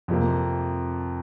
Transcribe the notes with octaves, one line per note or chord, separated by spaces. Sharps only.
F2 C3 F3 A#3